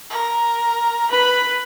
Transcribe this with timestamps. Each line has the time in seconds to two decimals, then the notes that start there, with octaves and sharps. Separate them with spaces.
0.10 A#4
1.11 B4 B5